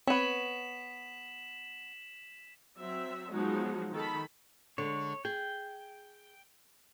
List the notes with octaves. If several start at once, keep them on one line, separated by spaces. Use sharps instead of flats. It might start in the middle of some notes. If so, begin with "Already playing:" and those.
B3 C4 C#5 B5 B6 E7 F#7
F#3 C4 E5
F3 F#3 G#3 B3 D#4 F#4
D#3 A4 B5
D3 G#3 C#5
G#4 G5